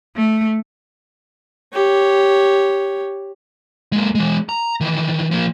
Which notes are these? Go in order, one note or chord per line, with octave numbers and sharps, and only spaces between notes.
A3
G4 C#5
G#3 A#3
E3 G#3
A#5
D#3 E3
F3 A#3